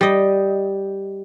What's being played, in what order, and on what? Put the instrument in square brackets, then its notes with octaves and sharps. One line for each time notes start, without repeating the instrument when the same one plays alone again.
[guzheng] G3 D#5